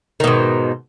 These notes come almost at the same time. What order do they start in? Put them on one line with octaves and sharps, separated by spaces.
D#3 B2 G#2